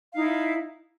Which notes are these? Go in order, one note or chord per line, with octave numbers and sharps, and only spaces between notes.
D#4 E4 F5